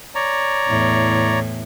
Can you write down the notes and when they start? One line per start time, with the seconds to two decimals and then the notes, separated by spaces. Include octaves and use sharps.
0.15 C#5 D5 A#5
0.68 E2 A2